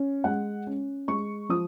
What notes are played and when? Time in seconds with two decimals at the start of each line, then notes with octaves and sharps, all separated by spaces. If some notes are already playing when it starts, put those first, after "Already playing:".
Already playing: C#4
0.24 G#3 F#5
0.67 C#4
1.08 G#3 C#6
1.49 F3 D#6